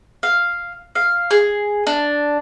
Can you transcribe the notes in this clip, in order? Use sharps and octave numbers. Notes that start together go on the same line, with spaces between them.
F5
F5
G#4
D4